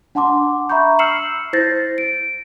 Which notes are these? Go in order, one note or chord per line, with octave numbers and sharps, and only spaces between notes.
D4 F#5 A5 C6 D6
E5 A#5 B5 C#6 G6
E6 F6 C7 C#7 E7 F#7
E4 C5 G6 A6 A#6 C7
D7